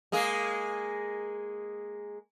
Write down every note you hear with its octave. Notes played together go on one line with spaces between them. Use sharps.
G#3 A#3 G#4